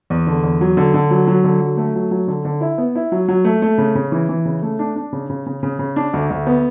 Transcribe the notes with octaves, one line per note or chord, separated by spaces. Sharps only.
E2
D3
E2
F#3
D3
D3
F#3
F#3
D3
F#3
A3
F#3
F#3
D3
D3
E4
B3
E4
F#3
F#3
A3
A3
C#3
C#3
E3
E3
C#3
A3
D4
D4
C#3
C#3
C#3
C#3
C#3
D4
D2
D2
B3